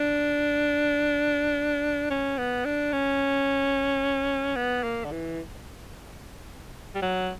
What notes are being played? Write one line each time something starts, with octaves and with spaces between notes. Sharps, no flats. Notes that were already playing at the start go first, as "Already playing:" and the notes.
Already playing: D4
C#4
B3
D4
C#4
B3
A#3
D3
E3
G3
F#3